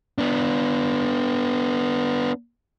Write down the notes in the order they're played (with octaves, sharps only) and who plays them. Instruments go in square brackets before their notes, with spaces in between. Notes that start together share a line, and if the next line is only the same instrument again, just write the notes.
[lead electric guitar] B3 D4